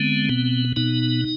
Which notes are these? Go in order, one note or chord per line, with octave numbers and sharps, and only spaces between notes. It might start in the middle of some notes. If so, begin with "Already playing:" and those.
Already playing: D3 G#3 B3 C4
B2 B3
B2 B3 D#4